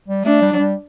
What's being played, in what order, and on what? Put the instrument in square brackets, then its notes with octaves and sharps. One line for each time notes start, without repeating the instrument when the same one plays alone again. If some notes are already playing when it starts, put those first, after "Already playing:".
[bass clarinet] G3
[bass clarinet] A3 [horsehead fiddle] D4
[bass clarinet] G3
F#3
G3